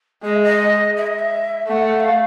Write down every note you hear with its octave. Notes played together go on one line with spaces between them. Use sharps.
G#3 D#5
E5
D#5
E5
D#5
E5
A3 F#5
E5
F5